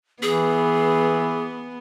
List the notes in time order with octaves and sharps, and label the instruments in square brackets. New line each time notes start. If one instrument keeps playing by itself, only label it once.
[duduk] E3 [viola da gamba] B3 [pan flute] G#4